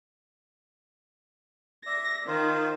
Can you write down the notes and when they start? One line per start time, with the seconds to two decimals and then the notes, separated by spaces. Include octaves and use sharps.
1.86 D5 E5 A#6
2.27 D#3 F4 C5